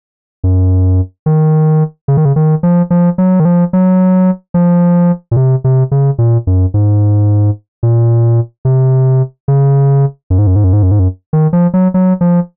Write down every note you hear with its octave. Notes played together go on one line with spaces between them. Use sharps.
F#2
D#3
C#3
D#3
C#3
D#3
F3
F3
F#3
D#3
F3
F#3
F3
A#2
C3
C3
C#3
A#2
F#2
G#2
A#2
C3
C#3
F#2
G#2
F#2
G#2
F#2
G#2
F#2
G#2
F#2
D#3
F3
F#3
F#3
F3